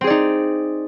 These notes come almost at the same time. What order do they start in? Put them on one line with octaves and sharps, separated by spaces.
C4 G#4 D5 D#4